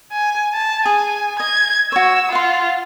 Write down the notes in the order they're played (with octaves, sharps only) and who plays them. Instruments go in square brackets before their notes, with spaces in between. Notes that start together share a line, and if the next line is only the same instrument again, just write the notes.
[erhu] G#5
A5
[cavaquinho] G#4 [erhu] G#5
[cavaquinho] D#5 [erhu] G#6
[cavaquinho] F#4 C#5 [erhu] E6
[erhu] F4 [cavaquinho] F#5 C6